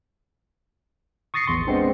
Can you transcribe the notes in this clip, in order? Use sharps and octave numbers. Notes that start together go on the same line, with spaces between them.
C#6 D#6 A6 A#6 C7 C#7
A1 E2 C6
G#3 B3 C4 D4